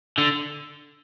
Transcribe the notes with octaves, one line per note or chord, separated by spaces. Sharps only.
D3